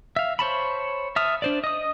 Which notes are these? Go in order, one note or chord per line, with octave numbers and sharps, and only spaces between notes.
E5 F5
C5 C#5 A5 B5
E5 A5 D#6 F6
D4 C5 D5
D#5 D#6